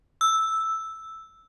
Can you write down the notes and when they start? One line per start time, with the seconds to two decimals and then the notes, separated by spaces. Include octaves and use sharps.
0.21 E6